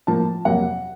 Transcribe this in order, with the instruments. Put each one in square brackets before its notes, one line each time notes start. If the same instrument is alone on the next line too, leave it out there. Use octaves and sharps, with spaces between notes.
[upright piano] A2 F3 A#3 A5
F2 C3 F#3 A#3 F#5